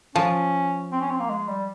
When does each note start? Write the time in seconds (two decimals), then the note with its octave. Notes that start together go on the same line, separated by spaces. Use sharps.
0.15 F3 C#4
0.92 C4
1.01 C#4
1.11 C4
1.20 A#3
1.30 G#3
1.48 G3